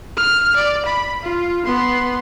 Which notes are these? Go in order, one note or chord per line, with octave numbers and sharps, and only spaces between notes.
F6
D5
B5
F4
B3 C6